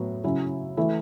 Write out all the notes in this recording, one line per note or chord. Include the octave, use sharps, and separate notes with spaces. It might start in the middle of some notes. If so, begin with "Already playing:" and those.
Already playing: A2 F#3 B3
C#3 F#3 C#4 E4
E3 A3 E4